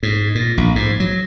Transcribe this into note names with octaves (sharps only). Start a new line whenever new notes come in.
G#2
A#2
A#1
G#2
F#3